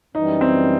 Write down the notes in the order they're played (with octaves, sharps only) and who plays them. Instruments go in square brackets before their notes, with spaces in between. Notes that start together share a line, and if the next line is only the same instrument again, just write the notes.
[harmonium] F#2 E3 G3 [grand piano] D#4
[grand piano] C4